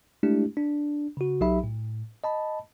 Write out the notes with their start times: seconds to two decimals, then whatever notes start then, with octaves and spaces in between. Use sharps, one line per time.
0.23 G#3 A3 D4 E4 G4
0.57 D4
1.17 C#3 F#4
1.41 B1 F#3 D#4 G4 E5 B5
1.64 A2
2.24 D#5 A5 B5